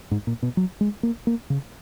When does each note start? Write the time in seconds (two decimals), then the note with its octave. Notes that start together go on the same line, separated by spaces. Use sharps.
0.11 G#2
0.27 A#2
0.43 B2
0.57 F#3
0.81 G#3
1.03 A#3
1.27 A#3
1.50 C#3